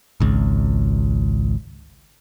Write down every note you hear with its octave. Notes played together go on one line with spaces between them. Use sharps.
G#1 C#2